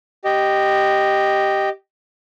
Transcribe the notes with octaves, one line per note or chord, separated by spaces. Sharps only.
G4 D#5